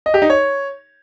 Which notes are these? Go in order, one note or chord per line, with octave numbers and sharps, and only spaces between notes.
D#5
G4
D#4
C#5